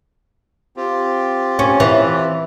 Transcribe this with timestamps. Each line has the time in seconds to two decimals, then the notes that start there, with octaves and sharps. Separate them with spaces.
0.77 C4 F4 G4
1.59 C#4
1.80 E3